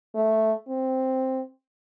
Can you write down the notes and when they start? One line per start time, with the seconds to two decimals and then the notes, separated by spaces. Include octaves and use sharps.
0.15 A3
0.68 C4